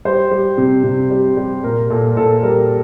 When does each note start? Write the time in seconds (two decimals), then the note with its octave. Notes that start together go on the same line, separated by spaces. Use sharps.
0.05 G3 C5
0.31 G3
0.58 C3
0.84 C3
1.11 G3
1.37 G3
1.64 A#2 A#4
1.90 A#2 A4
2.17 A#2 A4
2.43 G3 A#4